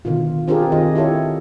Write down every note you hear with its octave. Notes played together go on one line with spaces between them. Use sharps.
B2 D3 D#3 F4
C4 D4 F4 G4 G#4 A#4
D#3 F4 G#4 D#5
E4 G4 A4 C#5